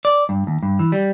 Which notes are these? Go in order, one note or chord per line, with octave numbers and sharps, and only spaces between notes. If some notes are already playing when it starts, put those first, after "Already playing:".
D5
G2
D#2
G2
E3
G3